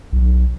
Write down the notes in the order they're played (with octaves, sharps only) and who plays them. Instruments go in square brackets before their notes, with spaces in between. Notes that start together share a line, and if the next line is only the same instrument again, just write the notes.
[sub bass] B1